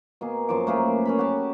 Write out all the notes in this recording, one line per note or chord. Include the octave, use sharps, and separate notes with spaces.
B2 A#3 G#4
F#2 F3 A5 D6
A3 A#3 G#4 B4
C#4 A#5 B5
F#4 G4 A5